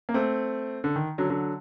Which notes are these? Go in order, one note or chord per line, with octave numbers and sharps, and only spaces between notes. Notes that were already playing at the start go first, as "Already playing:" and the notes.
A#3
A3 C4
D3
D#3
D3 F#3
D3 F#3